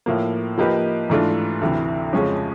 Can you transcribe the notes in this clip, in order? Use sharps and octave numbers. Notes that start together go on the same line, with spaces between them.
A2 F3 A#3
F3 A#3 D#4 G4 B4
G#2 E3 A3 D4 F4
D2 C3 E3
F2 C#3 F3 G#3 C#4